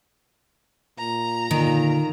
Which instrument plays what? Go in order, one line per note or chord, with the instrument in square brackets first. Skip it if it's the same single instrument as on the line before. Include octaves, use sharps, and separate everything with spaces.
[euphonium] A#2 [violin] A#5
[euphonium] A#2 [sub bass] D3 [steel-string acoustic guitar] D#3